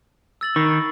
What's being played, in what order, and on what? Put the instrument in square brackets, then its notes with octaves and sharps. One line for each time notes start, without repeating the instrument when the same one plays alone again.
[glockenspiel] E6 A6 F#7
[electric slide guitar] D#3 [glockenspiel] B5 C#6 A#6
[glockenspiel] A6